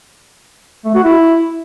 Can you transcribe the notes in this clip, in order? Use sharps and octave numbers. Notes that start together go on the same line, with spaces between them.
A3
F#4
E4